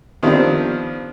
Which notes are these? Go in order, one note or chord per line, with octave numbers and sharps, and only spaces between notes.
D#3 F3 G3 B3 C4 D4